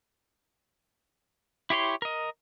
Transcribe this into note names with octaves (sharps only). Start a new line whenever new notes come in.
E4 G4 C#5 C6
A#4 D#5